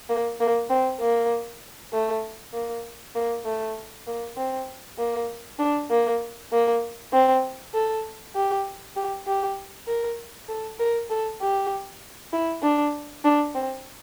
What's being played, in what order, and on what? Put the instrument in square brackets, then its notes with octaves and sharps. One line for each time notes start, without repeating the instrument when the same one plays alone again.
[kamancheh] A#3
A#3
C4
A#3
A3
A#3
A#3
A3
A#3
C4
A#3
D4
A#3
A#3
C4
A4
G4
G4
G4
A#4
A4
A#4
A4
G4
E4
D4
D4
C4